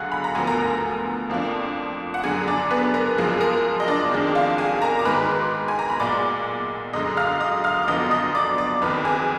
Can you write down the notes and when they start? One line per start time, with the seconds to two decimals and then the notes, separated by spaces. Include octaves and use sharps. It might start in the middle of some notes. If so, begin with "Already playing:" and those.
Already playing: F#2 D3 G#3 F#4 G#4 F5 F#5 G#5
0.12 B5
0.24 A#5
0.35 D2 D3 F3 B3 G#5
0.47 A#4 A#5
1.30 F2 F3 A#3 D4
2.14 F#5
2.23 F#2 D3 F#3 D4 G#4 G#5
2.48 D4 D5
2.71 B3 B4
2.94 A#4
3.17 F#1 F#2 F3 G#3 G#4
3.41 A#4
3.80 D#5
3.88 D4 D5
4.11 F2 D#3 G#3 D4
4.35 F4 F5
4.58 G#4 G#5
4.82 A#4 A#5
4.99 D6
5.05 G#2 D#3 G#3 B4 B5
5.68 G#5
5.79 A#5
5.90 B5
6.00 B1 A#2 G#3 D5 D6
6.93 F#2 D3 G#3 D#5 D#6
7.17 F5 F6
7.40 D#5 D#6
7.64 F5 F6
7.83 D6
7.88 G#1 F#2 D3 F3 B3 D#5 D#6
8.11 D#5 D#6
8.35 D5 D6
8.58 D5 D6
8.82 F#1 F2 D#3 B4 B5
9.05 G#4 G#5